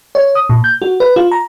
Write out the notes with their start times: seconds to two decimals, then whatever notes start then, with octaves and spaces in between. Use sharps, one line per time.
0.15 C#5
0.35 D#6
0.50 A#2
0.64 G6
0.82 F#4
1.00 B4
1.16 F4
1.31 A#5